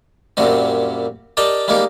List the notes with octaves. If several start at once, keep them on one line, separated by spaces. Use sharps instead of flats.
F#2 A#2 F#3 G3 C4
G4 A#4 D5 D#5 G5 A5
G3 G#3 A#3 D#4 G4